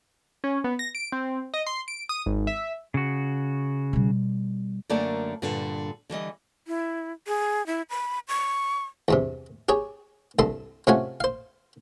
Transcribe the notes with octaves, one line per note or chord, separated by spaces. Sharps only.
C#4
B3
A#6
D7
C4
D#5
C6
D7
D#6
G#1
E5
C#3 F#4
B2 G3
F#2 D3 A3 A#3 D5 G#5
G2 A#2 D3
D3 E3 G3 D#5
E4
G#4
E4
B5
C#6
E2 G2 C3
G4 G#4 C#5
C2 G2 A4 C6
C3 A3 C#4 F4 F#4 G#5
C5 F5